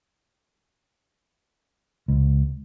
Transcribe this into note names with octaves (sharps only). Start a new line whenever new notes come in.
C#2